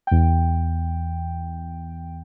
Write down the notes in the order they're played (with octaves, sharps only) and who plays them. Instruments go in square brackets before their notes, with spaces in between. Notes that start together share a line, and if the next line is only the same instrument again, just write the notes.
[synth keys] E2 G5